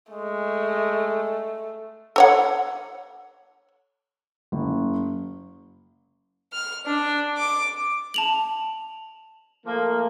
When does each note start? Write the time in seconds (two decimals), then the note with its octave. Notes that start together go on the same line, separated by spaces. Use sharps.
0.12 G#3 A3
2.16 A4 C#5 F#5
4.52 F#1
6.53 F6
6.87 D4
7.37 D6
8.14 A5 F7 F#7
9.66 F3 A3 A#3